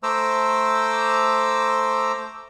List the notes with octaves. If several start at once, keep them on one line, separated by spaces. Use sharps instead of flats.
A3 C5 A#5 D6 E6